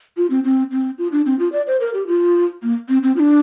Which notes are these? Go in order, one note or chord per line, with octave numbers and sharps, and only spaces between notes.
F4
C4
C4
C4
F4
D4
C4
F4
D5
C5
A#4
G4
F4
A#3
C4
C4
F4
D4